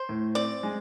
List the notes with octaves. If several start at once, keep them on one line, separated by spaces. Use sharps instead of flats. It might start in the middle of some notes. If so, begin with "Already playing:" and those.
Already playing: C5
A2
C4 D5
G#3